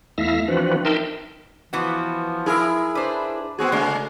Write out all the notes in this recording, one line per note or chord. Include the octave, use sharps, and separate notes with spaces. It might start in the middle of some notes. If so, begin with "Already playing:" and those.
E2 A3 E4 E5 F5 A#6
E3 F3 C4 D4 F#4 B4
D#4 A#4 E5 G5 A5 C6
E3 F3 B3 F#4
E4 G#4 A#4
D4 B4 C5
B3 C4 F#4 G#4
C#3 G#3 A3 D5